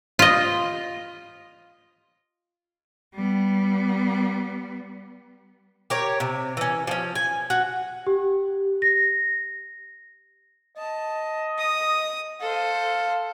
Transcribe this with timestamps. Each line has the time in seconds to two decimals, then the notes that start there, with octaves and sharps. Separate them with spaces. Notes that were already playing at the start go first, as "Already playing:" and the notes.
0.19 F4 D#5
3.14 G3 B3
5.90 G4 A#4 C#5
6.20 C3
6.57 E3 C#4
6.87 F3 C#4
7.15 G#5
7.50 F#4
8.07 G4
8.82 A#6
10.77 D#5 A5
11.58 D#6
12.41 A4 C5 F5